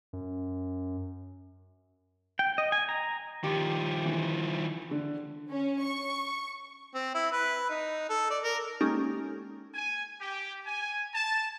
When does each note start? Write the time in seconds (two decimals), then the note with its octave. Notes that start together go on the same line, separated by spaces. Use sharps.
0.13 F#2
2.39 G5
2.58 D#5
2.72 G#5
2.89 A#5
3.44 D#3 F3 G4
4.05 E3
4.91 D3
5.50 C#4
5.83 C#6
6.94 C4
7.15 E4
7.32 B4
7.70 D#4
8.10 A4
8.30 D5
8.44 A#4
8.81 G#3 A#3 C#4 D#4 G4 A4
9.74 G#5
10.20 G4
10.66 G#5
11.14 A5